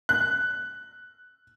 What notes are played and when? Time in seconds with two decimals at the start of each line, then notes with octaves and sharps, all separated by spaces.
0.09 F#6